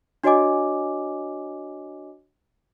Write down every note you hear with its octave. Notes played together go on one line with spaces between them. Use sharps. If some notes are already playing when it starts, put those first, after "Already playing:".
D4 F#4 C#5 D#5 G#5 D6